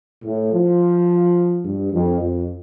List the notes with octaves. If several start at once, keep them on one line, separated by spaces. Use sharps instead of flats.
A2
F3
G2
F2
F2